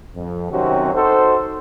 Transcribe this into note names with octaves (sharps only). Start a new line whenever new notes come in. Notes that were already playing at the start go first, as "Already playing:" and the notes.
F2
C3 D#3 F#3 C4 C#4 F#4
D#4 F#4 A4 C5